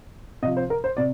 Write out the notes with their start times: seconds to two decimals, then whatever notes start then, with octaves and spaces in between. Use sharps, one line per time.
0.43 C3 D#5
0.46 F3
0.57 C5
0.70 A#4
0.84 C5
0.97 C3 D5